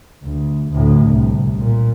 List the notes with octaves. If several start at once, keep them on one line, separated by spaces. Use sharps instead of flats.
D2
D2 A2
C2
A#2